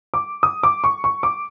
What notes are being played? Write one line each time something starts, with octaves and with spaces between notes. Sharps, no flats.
D6
D#6
D6
C#6
C#6
D6